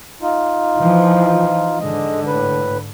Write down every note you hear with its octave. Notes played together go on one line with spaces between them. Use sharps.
D#4 F4
E3 F3
G#2 D3 G#3 D#5
A2 B4